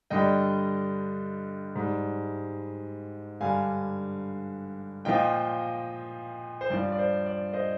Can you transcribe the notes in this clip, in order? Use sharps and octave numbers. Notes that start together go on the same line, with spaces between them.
G2 D3 G3 D#5 G5
G#2 G3
G2 D3 G3 F5 G#5
A#2 F3 D#5 G5
C5
G2 F3 D5
D5
C5
D5
C5 D#5